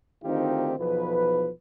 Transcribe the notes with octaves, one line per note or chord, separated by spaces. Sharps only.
D2 D#3 C4 D#4 F4 G4
B1 E2 F3 B4